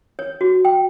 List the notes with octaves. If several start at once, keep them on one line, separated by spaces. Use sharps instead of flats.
C#5
F#4
G5